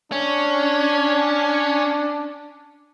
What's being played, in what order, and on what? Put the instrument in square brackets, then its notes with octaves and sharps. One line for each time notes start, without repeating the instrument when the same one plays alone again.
[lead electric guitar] C#4 [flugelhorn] D4